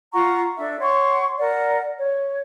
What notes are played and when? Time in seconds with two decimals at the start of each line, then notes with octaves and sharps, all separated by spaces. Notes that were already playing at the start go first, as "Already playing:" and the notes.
0.13 F4 F#5 A#5 C#6
0.56 D4 A4 E5
0.80 C#5 F#5 C6 C#6
1.39 A#4 D5 F#5
1.97 C#5